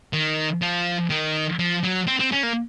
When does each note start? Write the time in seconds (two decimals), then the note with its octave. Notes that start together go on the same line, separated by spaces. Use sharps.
0.13 D#3
0.62 F3
1.10 D#3
1.59 F3
1.84 F#3
2.07 C4
2.19 C4
2.32 C#4
2.43 A#3